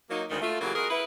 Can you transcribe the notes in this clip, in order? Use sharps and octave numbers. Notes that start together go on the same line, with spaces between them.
F#3 A#3 D#4
D2 D#3 G#3
A3 F4
C#3 E3 F#3 A#3 F4 G4
G#3 F#4 G#4 A#4
E4 B4